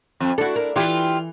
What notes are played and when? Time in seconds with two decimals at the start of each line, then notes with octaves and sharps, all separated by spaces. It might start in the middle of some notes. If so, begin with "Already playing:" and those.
0.20 F2
0.38 D4 E4 F#4 A4
0.56 A#4
0.76 E3 E4 F4 G4